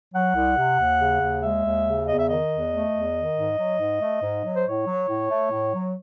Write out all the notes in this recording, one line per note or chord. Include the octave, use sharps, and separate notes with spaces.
F#3 F#5
C2
C3
D#2
C#3
D#2
G#3 E5
D#2
C#3
E2 D#5
E5
D#3 D#5
E2
A3
E2
D#3
G#2
F#3
G#2
A3
G#2
F#3
C5
A2 C#5
F#3
A2
A3
A2
F#3